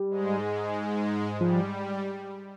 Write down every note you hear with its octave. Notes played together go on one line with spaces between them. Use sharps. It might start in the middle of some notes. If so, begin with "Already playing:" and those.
Already playing: G3
G#2 G#3
F3 G3